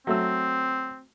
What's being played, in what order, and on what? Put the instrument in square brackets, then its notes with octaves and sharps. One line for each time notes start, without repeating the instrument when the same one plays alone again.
[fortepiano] F#3 A3 E6 [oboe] C4